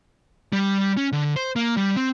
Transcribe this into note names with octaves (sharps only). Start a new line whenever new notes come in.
G3
C#4
D3
C5
A#3
G3
C4